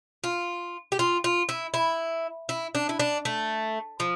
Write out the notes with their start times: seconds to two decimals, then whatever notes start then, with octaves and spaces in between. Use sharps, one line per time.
0.24 F4
0.92 G4
0.99 F4
1.24 F4
1.49 E4
1.74 E4
2.49 E4
2.75 D4
2.89 E4
3.00 D4
3.25 A3
4.00 F3